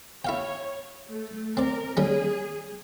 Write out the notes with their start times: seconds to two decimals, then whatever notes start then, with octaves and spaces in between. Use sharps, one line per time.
0.25 E4 C#5 F5 G5
1.09 A3
1.57 C4 A#4 D5
1.97 D#2 G3 C#4 G#4